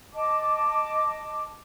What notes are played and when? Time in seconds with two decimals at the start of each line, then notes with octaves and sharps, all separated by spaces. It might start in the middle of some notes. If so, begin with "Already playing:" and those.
0.14 D#5 A5 D6